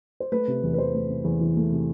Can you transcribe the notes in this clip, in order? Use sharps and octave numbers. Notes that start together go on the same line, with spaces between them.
C5
A3 B4
C3
E2
B4
E3 C5
A3
C3
E2
E3
A3
C3